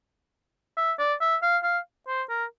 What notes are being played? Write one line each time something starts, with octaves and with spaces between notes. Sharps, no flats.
E5
D5
E5
F5
F5
C5
A#4